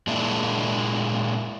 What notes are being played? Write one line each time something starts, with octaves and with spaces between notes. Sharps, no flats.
A#2 G#3 A#3 D4 E4